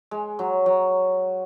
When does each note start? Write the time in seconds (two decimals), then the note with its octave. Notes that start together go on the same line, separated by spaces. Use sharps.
0.11 G#3
0.39 F#3
0.66 F#3